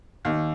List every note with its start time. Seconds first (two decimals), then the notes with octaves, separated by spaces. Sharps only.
0.25 D#2